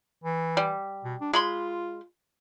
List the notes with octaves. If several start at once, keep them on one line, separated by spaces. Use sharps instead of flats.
E3
G3
B2
D4
G#3 F4 B5 C6